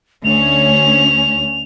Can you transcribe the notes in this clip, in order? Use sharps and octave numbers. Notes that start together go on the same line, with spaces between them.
D2 C#4 F7